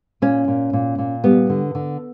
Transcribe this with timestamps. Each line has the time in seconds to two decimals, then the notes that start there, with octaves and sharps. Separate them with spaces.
0.22 A#2 C#4
0.48 A#2
0.73 A#2
0.98 A#2
1.24 G3 B3
1.50 D3
1.75 D3